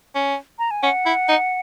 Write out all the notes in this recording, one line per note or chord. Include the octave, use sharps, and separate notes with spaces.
C#4
A#5
G#5
C#4 F#5
E4
D#4